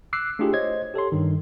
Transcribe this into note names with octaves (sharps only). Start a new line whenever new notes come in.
D6 E6 F#6 C7
A3 D4 E4 F4 G4 G#4
C5 C#5 D#5 G#6
G4 A4 C#5 C6
G2 D#3